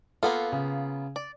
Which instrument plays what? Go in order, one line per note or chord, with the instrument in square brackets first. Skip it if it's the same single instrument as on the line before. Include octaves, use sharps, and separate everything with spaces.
[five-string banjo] A#3 B3 F4 [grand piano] A4
[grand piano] C#3
[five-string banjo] D5